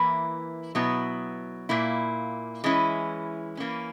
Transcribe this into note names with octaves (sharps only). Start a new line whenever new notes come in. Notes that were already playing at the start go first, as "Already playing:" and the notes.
Already playing: E3 A#3 E4 B4
B2 F#3 B3 E4
A#2 A#3 E4
E3 G#3 C#4 E4
E3 A#3 C#4